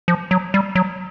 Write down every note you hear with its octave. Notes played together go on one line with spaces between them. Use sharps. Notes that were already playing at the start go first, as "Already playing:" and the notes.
F3
F#3
G3
F#3